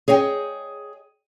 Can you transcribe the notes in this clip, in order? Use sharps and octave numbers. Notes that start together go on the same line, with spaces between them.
G#4 C#5 D#5 G5